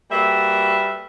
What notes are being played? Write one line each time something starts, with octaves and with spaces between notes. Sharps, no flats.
G3 A#3 F#4 A4 B4 E5